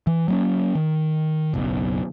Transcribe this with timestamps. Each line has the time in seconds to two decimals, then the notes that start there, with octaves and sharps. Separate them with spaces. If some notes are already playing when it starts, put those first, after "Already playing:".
0.07 E3
0.28 F#3 A#3 C#4
0.75 D#3
1.54 F#1 B1